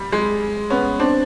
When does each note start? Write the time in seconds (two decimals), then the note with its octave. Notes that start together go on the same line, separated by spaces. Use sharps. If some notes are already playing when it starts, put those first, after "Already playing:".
Already playing: G3
0.12 G#3
0.70 B3 C#4
0.99 C4 D4